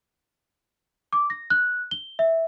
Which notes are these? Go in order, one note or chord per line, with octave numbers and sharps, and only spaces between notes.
D6
A#6
F#6
G7
E5